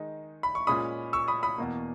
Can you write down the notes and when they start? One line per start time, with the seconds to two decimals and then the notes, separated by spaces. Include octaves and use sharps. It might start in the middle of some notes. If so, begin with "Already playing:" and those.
Already playing: D#3 G#3 D#4
0.43 B5
0.55 C#6
0.67 A#2 G#3 C#4 B5 D#6
1.13 C#6 E6
1.28 B5 D#6
1.43 B5 D#6
1.58 E2 B2 A#3